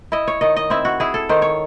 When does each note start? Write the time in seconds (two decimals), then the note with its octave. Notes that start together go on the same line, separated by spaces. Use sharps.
0.12 E4 D#5
0.28 C#5
0.41 D#3 D#5
0.56 D#5
0.70 C4 E4
0.85 F#4
1.00 E4 G#4
1.14 A4
1.29 D#3 C5
1.42 C#5